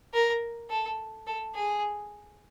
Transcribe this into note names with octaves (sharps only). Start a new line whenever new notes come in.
A#4
A4
A4
G#4